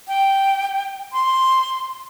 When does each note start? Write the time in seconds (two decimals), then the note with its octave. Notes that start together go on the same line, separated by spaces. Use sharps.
0.08 G5
1.13 C6